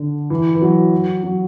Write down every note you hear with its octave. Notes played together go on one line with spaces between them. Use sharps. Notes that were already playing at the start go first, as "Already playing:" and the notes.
Already playing: D3
E3
E3
F#3
F#3